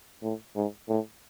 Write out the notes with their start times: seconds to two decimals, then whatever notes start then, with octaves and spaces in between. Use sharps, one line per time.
0.23 A2
0.56 G#2
0.89 A2